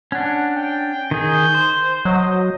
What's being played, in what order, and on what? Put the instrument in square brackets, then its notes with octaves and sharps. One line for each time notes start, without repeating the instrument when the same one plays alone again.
[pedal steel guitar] C#4 D4 [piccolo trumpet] F#5
[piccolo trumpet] G5
[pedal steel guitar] D#3 G#4 [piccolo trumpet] G6
[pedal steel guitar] C5
[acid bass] F#3 [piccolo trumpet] D#5